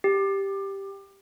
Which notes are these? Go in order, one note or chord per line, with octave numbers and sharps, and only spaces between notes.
G4